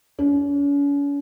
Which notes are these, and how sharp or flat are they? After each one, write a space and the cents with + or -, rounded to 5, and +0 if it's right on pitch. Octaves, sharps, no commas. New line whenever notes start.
C#4 +40